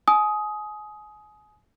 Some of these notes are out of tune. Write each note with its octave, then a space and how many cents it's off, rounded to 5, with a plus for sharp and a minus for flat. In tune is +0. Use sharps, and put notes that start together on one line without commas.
G#5 +30 D#6 +10